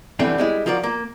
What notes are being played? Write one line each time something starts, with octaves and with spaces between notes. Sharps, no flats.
D3 E3 G3 A3 C4 D4
G3 G#3 E4
F3 F4 F#4 A#4 D5
A#3